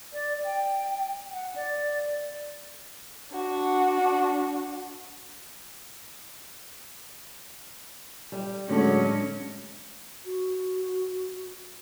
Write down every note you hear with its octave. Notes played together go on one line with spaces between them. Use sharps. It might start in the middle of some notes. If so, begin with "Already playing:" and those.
D5
G5
F#5
D5
D4 F#4
G3
A2 D3 F#3 G#3 C#4
F#4